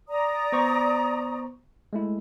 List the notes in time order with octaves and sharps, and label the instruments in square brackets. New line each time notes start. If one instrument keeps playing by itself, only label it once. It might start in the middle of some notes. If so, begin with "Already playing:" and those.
[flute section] D5 A#5 D#6
[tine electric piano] B3 C5 C#6
G#3 A3 E4